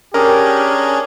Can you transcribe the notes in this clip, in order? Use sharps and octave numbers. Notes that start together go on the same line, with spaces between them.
C#4 D4 G4 G#4 A#4